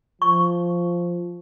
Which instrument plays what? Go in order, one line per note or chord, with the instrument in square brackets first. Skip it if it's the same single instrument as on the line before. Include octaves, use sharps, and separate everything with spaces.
[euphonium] F3 [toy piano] C#6